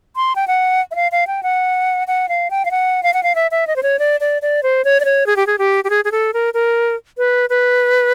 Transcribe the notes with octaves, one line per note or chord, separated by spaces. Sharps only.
C6
G5
F#5
E5
F5
F5
G5
F#5
F#5
F5
G5
F5
F#5
F5
F#5
F5
E5
E5
D#5
C5
C#5
D5
D5
D5
C5
C#5
D5
C#5
G#4
G4
G#4
G4
G4
G#4
G#4
A4
A#4
A#4
B4
B4